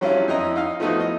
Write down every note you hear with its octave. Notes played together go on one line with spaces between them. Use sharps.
F#3 G3 C#4 D4 E4 F4
F2 E4 D#5 A#5
D#4 F5
F3 A3 B3 D#4 E4 F#4
D#5